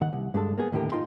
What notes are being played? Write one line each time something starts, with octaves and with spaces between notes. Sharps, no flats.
D#2 D#3 F#5
C2
G2 G#3 D4 A4
A#3 B3 G#4
D#2 A2 D3 G4 A#4
D#4 F4 D#5 G5 C6